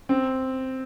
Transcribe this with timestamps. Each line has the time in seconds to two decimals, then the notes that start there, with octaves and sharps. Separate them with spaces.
0.09 C4